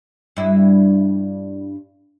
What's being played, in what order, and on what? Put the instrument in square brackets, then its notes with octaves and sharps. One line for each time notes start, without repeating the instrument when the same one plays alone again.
[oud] G2 E4